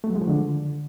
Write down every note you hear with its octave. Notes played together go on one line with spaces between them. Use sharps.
A3
F#3
G#3
F3
D3